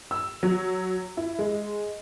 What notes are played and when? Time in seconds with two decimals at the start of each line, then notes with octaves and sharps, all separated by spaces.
0.11 E6
0.43 F#3
1.17 E4
1.39 G#3